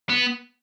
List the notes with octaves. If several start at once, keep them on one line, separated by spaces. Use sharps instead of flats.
B3